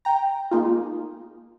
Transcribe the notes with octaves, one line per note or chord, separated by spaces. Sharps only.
G5 A#5
G#3 A#3 D#4 F4